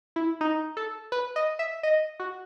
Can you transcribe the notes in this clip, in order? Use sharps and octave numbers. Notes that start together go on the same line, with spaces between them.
E4
D#4
A4
B4
D#5
E5
D#5
F#4